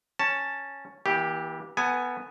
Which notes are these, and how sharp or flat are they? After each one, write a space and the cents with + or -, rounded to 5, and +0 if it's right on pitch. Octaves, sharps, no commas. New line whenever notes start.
C#4 +0 A5 +5
E3 -20 A#3 +40 G4 +0
B3 +0 A4 +40 G#5 +0